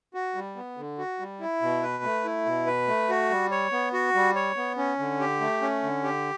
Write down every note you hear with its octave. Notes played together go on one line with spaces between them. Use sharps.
F#4
G3
B3
D3
F#4
G3
E4
B2
B4
A3
E4
B2
B4
A3
F#4
G3
C#5
B3
F#4
G3
C#5
B3
C#4
D3
G4
A3
C#4
D3
G4